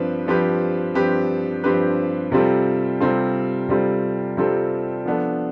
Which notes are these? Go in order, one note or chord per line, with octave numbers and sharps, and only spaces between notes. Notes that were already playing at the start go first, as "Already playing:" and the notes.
Already playing: G2 F3 C4 G4 B4
G2 F3 C4 G4 B4
G2 F3 C4 G4 B4
G2 F3 C4 G4 B4
C3 G3 C4 F4 A4
C3 G3 C4 F4 A4
C3 G3 C4 F4 A4
C3 G3 C4 F4 A4
F3 B3 D4 A4